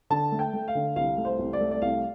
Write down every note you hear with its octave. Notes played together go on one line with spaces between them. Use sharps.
D3 A5
A3
G5
A3
F5
D3
C2 F5
A3
C5
C2
D5
A3
D5
C2 F5